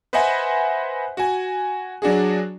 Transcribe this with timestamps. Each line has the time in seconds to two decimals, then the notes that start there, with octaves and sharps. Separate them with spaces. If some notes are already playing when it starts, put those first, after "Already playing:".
0.13 B4 C5 D#5 E5 F#5 G#5
1.17 F#4 G#5
2.02 F#3 D4 F#4 G#4